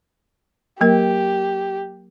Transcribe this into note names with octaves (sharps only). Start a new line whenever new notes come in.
F#3 A#3 G4 A#4